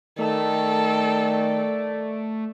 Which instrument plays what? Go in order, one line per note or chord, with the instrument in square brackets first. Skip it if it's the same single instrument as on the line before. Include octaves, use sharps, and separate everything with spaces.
[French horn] D#3 [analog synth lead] A3 [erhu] A4 [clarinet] D5